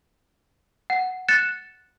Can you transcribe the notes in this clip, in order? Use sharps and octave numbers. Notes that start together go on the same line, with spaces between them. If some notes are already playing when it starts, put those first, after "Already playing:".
F#5
F#6 A6 C#7 E7